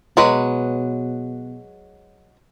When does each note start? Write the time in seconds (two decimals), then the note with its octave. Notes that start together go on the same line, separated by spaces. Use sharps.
0.17 B2 F#3 G#3 B4